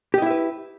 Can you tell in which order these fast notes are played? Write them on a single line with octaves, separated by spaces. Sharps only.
G4 D#5 E4 E5 B4